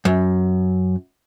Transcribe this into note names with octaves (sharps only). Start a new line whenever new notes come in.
F#2